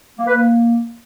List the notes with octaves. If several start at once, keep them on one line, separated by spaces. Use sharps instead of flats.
A#3
B4
A#3